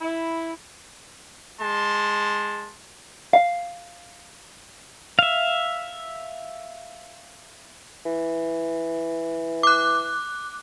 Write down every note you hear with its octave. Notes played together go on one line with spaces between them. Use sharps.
E4
G#3 A5 C6
F5
E5 F5
E3
D6 F#6